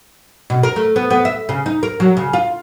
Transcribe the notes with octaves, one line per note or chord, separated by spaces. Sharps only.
B2
A#4
A3
B3
B3
E5
C#3
D#4
A#4
F#3
C#3
F4